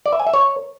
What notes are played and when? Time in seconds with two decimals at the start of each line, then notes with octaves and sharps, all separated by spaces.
0.06 D5
0.13 E5
0.20 G#5
0.27 E5
0.34 C#5